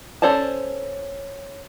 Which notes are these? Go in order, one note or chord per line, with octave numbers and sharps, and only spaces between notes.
C#4 A4 C5 D5 A5